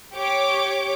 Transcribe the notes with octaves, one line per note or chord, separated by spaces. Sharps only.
G4 C#5 D6